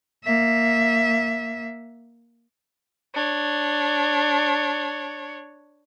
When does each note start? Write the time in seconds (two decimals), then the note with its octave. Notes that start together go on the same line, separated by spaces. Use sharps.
0.25 A#3 E5
3.14 D4 C#5